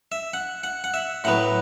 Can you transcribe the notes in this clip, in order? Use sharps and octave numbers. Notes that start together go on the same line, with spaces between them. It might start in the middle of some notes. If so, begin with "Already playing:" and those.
E5
F#5
F#5
F#5
E5
A2 F#3 B3 F#5